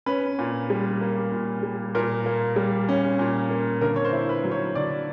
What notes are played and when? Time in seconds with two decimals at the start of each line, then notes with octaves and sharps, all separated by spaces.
0.06 C#4 B4
0.39 A#2
0.70 G3
1.01 A#3
1.32 A#2
1.63 G3
1.95 A#2 A#4
2.26 A#3
2.56 G3
2.89 C#4
3.19 A#2
3.50 A#3
3.81 D3 A#4
3.96 C#5
4.05 C5
4.13 E4
4.29 B4
4.44 F#3
4.51 C#5
4.75 D3 D5